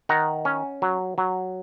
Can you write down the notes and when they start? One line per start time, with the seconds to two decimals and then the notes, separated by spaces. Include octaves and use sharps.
0.09 D#3 F#5 A#5
0.45 C#4
0.82 F#3
1.18 F#3